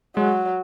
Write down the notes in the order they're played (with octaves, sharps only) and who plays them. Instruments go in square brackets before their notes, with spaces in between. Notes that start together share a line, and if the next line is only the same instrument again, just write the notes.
[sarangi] F#3 [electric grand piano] G#3